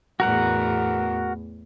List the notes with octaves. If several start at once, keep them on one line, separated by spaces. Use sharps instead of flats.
E2 A2 F#4 A#4 F#5